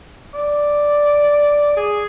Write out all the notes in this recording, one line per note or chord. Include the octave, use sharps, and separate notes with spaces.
D5
G#4